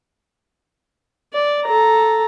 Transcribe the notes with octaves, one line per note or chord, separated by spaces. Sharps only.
D5
A4 A#5